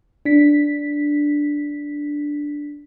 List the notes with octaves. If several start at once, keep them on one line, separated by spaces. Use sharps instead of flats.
D4 B6